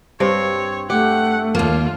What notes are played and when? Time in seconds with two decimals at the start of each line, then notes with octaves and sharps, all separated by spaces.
0.20 G2 C4 C5 C#5
0.90 A3 G4 F#5
1.55 D#2 A#3 F4